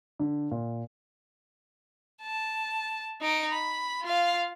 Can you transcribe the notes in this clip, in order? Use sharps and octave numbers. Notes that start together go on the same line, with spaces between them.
D3
A#2
A5
D#4 D7
B5
F4 F5